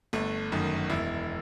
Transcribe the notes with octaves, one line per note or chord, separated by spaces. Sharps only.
G1 A3
F#2 D#3
E1 E4